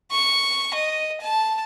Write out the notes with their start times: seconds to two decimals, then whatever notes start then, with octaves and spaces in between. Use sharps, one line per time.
0.11 C#6
0.74 D#5
1.21 A5